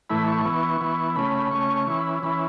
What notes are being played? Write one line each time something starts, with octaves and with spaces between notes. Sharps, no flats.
A2 E3 A3 E4 B5
C#6
E3 B3 E4
E3 B3 E4
C#3 A3 C#4 B5
B5
C#3 A3 C#4 C#6
E3 C#4 E4 C#6
B5
E3 C#4 E4 B5